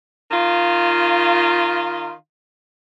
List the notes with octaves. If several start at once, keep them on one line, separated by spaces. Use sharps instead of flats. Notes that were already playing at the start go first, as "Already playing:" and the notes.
D#3 F4